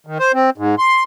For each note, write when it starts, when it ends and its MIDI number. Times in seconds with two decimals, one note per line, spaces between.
0.07 0.18 51
0.19 0.32 72
0.34 0.50 60
0.58 0.75 44
0.78 1.04 84